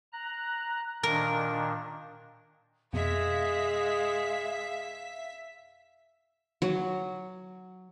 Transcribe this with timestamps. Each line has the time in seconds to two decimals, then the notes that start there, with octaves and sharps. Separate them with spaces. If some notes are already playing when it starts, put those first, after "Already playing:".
0.13 A#5 F#6
1.03 A#2 D#3 D4 A#4
2.93 F2 B2 G#3 E5 F5 B6
6.62 F#3